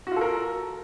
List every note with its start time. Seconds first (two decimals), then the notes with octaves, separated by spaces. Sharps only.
0.07 F#4
0.12 F4
0.16 A4
0.21 A#4